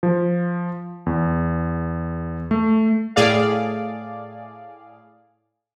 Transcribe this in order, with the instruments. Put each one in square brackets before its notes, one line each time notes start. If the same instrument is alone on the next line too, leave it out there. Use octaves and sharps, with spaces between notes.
[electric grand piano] F3
E2
A3
[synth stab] A2 G#4 D5 F5